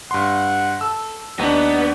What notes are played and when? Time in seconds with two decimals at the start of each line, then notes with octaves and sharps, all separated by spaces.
0.11 G2 F#5 C6
0.81 A4 E6
1.39 D#2 B3 D4 D#4